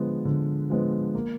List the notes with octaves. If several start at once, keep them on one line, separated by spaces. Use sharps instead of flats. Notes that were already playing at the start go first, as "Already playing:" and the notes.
Already playing: D3 F3 G#3 B3
D3
F3 G#3 B3
A#3